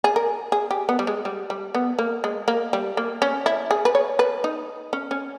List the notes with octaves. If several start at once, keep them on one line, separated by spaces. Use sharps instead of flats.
G#4
A#4
G#4
G4
B3
G3
G#3
G3
G3
B3
A#3
G#3
A#3
G3
A#3
C#4
E4
G#4
B4
C#5
B4
D#4
C#4
C#4